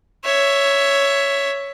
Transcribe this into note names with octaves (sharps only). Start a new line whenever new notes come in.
C#5 E5